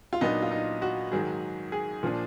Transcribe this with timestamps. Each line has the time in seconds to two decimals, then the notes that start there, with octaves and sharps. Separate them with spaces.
0.13 F4
0.21 A#2 F#3 B3 D4 D#4
0.42 F4
0.51 D#4
0.82 F#4
1.12 G#2 D#3 F#3 G#4
1.72 G#4
2.03 A#2 F3 A#3 D4